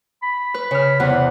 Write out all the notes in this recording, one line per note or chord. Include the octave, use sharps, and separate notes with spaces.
B5
B4
C#3 F6
E2 C3 F#5